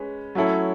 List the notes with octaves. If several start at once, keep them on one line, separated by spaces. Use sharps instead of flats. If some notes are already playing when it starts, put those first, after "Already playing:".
Already playing: G#3 C#4 B4
F#3 A3 C#4 E4 A4